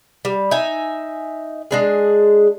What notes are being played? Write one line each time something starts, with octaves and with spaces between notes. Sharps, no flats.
G3
D#4 E5 G#5
G#3 D4 G#4